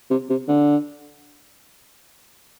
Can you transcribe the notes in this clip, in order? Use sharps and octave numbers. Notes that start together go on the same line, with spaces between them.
C3
C3
D3